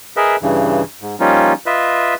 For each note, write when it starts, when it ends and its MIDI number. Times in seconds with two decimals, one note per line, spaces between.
0.17 0.36 68
0.17 0.36 70
0.17 0.36 71
0.17 0.36 75
0.17 0.36 76
0.42 0.83 43
0.42 0.83 49
0.42 0.83 52
1.02 1.15 44
1.20 1.53 53
1.20 1.53 55
1.20 1.53 58
1.20 1.53 61
1.20 1.53 63
1.20 1.53 65
1.66 2.15 65
1.66 2.15 71
1.66 2.15 75
1.66 2.15 76